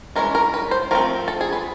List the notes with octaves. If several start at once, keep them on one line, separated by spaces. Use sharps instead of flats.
E3 G#3 C#4 A#4
A#4
B4
C5
F3 A3 C4 A#4
A4
G#4
B4